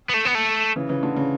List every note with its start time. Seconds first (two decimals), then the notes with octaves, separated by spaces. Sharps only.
0.10 B3
0.14 A3
0.25 B3
0.35 A3
0.76 C#3 E3
0.89 C#3 E3
1.03 D3
1.17 C#3